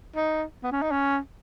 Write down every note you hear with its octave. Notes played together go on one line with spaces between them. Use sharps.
D#4
B3
C#4
D#4
C#4